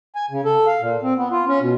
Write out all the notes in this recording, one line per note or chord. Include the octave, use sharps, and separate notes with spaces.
G#5
C#3
A4
F5
A#2
C4
B3
F4
C#4
B2